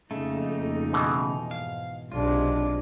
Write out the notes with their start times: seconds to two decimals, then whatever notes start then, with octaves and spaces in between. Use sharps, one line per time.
0.11 F2 C#3 A3 A#3 D#4 A4
0.93 B2 E3
1.51 G#2 F5
2.12 B1 C3 G#3 D4 F4